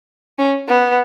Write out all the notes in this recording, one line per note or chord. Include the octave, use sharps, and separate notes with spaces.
C#4
B3